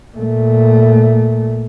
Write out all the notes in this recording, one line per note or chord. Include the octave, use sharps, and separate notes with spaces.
A#2 A3